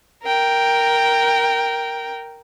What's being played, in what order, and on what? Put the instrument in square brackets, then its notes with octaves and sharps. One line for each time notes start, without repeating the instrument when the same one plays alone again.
[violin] A#4 G5